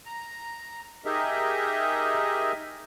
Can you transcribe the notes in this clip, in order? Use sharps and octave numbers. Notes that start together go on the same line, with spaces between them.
A#5
D#4 G4 G#4 A#4 D#5 E5